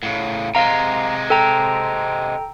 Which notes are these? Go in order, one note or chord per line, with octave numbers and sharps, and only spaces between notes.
A2 C#3
C3 G#3 F5 A#5
A4 G5 A#5